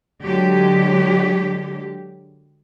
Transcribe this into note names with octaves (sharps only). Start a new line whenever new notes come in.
D3 F#3 G#3 G4